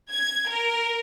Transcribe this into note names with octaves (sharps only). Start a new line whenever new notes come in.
G#6
A#4